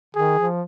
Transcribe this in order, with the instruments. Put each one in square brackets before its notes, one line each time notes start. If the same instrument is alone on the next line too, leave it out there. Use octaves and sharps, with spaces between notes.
[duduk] D#3 [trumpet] G#4
[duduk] F3